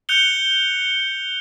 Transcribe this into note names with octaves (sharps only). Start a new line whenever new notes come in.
F#6 G6 C#7 F7 G7